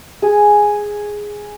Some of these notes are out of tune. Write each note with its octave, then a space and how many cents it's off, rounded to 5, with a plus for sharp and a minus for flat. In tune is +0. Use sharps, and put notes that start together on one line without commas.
G#4 +0